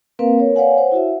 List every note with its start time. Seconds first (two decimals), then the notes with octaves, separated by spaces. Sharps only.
0.19 A#3 C4 A#4 B4 F5
0.39 A#4 C#5
0.56 B4 C#5 D5 F5 F#5 G#5
0.78 C5 F#5
0.92 E4 F#4 E5